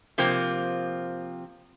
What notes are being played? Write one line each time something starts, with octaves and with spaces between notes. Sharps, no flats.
C3 F3 A#3 C4